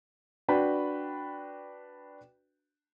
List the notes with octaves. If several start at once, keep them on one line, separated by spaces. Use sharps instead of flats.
D4 F#4 B4 G5 B5